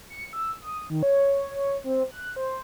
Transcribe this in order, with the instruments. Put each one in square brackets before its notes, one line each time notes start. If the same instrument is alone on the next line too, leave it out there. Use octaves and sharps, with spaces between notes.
[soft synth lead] C#7
E6
D#6
D#3
C#5
C#5
C4
F#6
C5